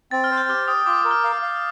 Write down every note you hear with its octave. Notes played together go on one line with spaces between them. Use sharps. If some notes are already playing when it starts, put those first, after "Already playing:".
C4 A6
F6
C5
G6
G4 F6
G5 D#6
F4 D6
A#4
F6
F5
F5